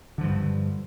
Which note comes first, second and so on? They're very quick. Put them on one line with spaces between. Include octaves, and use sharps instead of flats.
D3 F3 G2